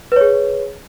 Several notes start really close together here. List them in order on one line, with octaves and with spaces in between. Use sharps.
B4 C#5 G#4